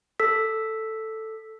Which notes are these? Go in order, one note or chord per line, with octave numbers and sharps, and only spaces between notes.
A4 E6 B6